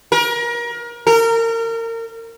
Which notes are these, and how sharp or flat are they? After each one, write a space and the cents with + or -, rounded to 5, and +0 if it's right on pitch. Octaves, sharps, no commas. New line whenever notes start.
A#4 +30
A#4 -30